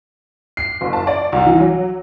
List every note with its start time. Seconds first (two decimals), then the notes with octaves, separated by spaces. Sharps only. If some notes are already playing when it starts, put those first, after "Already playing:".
0.57 C7
0.81 F#1
0.93 A5
1.07 D5
1.32 C2
1.46 E3
1.60 F#3